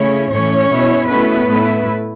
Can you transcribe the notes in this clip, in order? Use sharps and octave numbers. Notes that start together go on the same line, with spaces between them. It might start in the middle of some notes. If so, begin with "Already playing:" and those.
Already playing: C#3 A3 C#4 E4 C#5
A2 E3 A3 C#4 C#5
B2 B3 E4
B2 A3 B3 C#4 E4 B4
A2 A3 E4